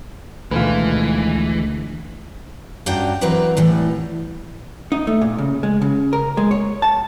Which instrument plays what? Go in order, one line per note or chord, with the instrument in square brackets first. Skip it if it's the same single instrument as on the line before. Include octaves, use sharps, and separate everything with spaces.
[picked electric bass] D2 [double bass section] B2 D#3 G#3 [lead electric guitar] E3 [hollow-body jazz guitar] F4 B4
[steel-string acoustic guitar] G2 C#4 D4 F#4 G5 A#5
E3 F#3 C4 A#4 B4 D5
A2 E3 G3
[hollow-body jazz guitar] D#4
A3
A#2
C#3
G#3
C#3
A#4
G#3
C#5
A5